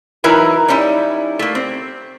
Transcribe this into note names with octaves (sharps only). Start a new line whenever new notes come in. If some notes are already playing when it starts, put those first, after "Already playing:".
E3 F#3 D#4 E4 A#4 B4
G3 C#4 D#4 E4
A3 A#3
C4